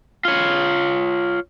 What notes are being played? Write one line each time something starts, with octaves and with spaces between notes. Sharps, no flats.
F4 C#5